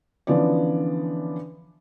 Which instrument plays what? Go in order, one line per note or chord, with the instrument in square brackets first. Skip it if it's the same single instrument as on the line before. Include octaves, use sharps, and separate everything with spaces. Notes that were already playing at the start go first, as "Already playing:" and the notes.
[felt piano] D3 E3 F3 B3 C#4 D5